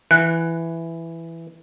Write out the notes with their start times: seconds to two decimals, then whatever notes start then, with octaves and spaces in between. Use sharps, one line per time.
0.11 E3 F#5